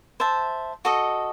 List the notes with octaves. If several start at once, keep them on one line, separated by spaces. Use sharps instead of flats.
C5 E5 A5
F#4 A4 D#5